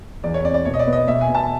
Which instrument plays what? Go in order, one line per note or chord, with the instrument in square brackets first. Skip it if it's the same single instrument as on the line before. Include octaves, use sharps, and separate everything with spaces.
[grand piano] E2 D5
C#5
C4 D5
D5
B2 C#5
D#5
D5
B3
D#5
B2 E5
G#5
B2
A5